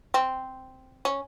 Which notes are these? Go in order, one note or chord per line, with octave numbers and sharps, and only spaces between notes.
C4
C#4